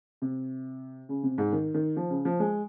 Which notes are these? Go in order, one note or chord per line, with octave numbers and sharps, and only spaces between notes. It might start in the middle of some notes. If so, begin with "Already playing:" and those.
C3
C#3
C3
G#2
D#3
D#3
F3
C#3
F3
G#3